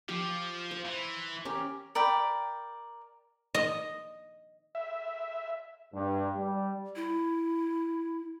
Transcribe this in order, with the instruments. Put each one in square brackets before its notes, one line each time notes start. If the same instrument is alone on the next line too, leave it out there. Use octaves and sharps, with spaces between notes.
[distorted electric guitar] F3 [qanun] G4
[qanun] C5
[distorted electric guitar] E3
[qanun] C#4 G4 A#4
[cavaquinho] A#4 D5 G5 B5
[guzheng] D#5
[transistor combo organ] E5
[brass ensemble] G2
G3
[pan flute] E4